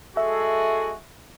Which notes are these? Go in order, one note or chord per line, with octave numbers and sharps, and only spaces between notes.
G#3 F#4 G#4 A4 E5